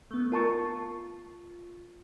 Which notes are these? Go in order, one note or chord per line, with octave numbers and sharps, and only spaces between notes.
A3 B3
F4 A#4 A5 C#6